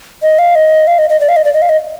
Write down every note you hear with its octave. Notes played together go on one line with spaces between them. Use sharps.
D#5
F5
D#5
F5
D#5
D#5
D5
F5
D#5
D5
D#5
F5
D#5